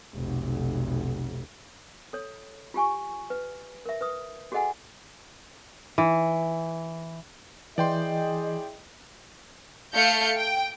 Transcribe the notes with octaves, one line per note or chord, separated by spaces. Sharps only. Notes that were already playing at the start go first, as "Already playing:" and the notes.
F1 B1
A4 C#5
F4 G4 G#5 C#6
B4
A#4 E5
B4 D#6
F#4 G#4 A4 D#5 F#5 G#5
E3
E3 E4 G#4 D5 D#5 G5 C6
A3 F5 G6 C#7
G5